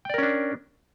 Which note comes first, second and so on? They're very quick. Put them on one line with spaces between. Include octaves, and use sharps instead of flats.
G5 D5 A#4 C#4 D4